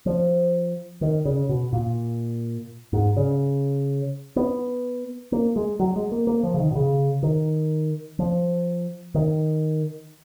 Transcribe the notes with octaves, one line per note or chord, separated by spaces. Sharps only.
F3
D#3
C#3
B2
A#2
G#2
C#3
B3
A#3
G#3
F#3
G#3
A#3
A#3
F3
C#3
D#3
B2
C#3
D#3
F3
D#3